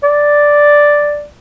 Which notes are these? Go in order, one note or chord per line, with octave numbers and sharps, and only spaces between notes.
D5